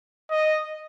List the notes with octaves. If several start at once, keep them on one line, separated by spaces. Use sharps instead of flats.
D#5